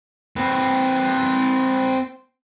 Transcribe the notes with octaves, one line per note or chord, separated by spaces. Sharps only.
C4 B4